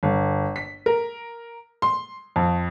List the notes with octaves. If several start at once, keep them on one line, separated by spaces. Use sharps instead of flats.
G1
B6
A#4
C6
F2